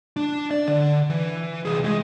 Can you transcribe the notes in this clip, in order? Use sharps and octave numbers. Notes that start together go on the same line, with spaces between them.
D4
D5
D3
E3
C2 G#4
G#3 G#4